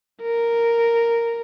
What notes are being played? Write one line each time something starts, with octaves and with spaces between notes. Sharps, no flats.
A#4